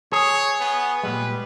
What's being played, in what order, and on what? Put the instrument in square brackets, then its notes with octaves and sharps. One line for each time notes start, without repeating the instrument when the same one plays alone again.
[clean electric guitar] G#4 [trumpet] C#5
[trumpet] B3
[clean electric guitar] A#2 G3 G#3 [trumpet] B4